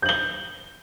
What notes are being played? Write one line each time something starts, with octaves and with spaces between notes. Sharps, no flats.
G6 F#7 G7